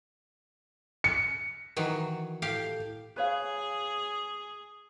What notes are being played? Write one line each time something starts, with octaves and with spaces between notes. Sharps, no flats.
C#7
D#3 E3 F#3
A2 G4 F5
G#4 B4 C#5 F5